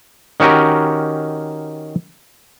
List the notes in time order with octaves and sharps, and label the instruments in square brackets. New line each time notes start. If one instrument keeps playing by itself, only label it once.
[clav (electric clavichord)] D#3 C#4 F#4 G4 A#4